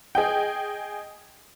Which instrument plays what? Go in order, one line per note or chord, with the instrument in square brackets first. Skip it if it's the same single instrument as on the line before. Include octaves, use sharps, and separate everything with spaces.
[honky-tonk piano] G#4 D#5 G5